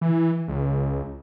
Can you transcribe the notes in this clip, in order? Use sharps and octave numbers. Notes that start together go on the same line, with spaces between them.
E3
C#2